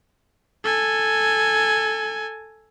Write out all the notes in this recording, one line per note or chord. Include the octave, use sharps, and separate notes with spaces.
A4 G#5